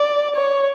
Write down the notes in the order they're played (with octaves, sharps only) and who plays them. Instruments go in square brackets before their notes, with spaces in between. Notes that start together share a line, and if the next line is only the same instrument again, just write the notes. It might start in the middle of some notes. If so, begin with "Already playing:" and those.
Already playing: [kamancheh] D5
C#5